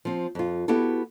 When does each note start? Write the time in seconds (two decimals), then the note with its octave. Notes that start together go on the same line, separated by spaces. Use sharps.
0.05 F3 C4
0.35 F2 F4
0.68 B3 E4 F#4 G4 A4